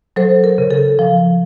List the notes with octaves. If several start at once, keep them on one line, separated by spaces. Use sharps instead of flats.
F#3 A4 C5
A#4
C#3
A4
F3